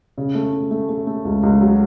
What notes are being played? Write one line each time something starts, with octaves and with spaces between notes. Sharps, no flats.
C#3
A3
A3
A3
A3
A3
C#2
C#2
F#3